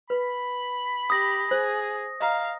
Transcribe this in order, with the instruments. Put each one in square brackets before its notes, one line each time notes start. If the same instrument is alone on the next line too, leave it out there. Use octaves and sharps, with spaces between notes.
[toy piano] B4 [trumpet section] B5
[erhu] G4 [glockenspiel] D#6 A#6
[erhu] G#4 [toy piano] C5
[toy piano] D#5 A#5 [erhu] F5